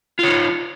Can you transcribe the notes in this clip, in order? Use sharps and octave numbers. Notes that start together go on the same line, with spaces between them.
D#4 F4 C#5